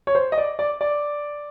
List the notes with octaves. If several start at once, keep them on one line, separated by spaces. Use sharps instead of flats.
C#5
C5
D#5
D5
D5
D5